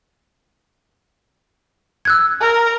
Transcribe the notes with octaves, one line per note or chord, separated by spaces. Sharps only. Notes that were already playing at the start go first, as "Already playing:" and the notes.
E6 F#6 G#6
A#4